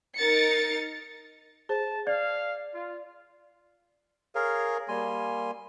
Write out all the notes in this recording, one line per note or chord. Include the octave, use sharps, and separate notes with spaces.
D#4 A#4 A6 C#7
G#4 C5 A5
D5 F5
F4
G#4 A#4 C#5 F5
G3 A#3 G#5 C6